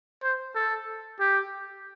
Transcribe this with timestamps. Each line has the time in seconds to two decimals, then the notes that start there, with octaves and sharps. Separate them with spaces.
0.23 C5
0.55 A4
1.20 G4